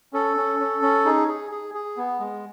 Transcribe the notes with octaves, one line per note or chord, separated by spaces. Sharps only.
C#4 A4
C#4
C#4
C#4
D#4 G#4
G#4
G#4
G#4
B3
G#3